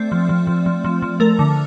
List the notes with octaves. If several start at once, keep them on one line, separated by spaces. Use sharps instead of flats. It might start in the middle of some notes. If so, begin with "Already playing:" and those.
Already playing: A3 C4 D5
F3
F3
F3
F3
F3
F3
A3 A#4
D3